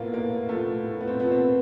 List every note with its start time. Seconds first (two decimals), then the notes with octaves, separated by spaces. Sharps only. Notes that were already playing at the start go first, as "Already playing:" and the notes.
Already playing: A2 F3 A#3 B3 F4
0.14 A2 A#3
0.49 F3 A3
0.84 A2
1.00 B3
1.08 C4
1.19 F3 B3
1.32 C4